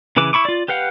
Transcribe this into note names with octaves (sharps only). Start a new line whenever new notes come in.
C#3 E3 B4 D6
E4 B5 C#6 D6
F4 D5
G4 B4 F5 F#5